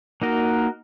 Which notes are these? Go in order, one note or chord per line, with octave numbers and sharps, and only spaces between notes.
A#3 D#4 F#4 A#4 D#5